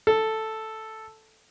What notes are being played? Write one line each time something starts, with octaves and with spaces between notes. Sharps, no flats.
A4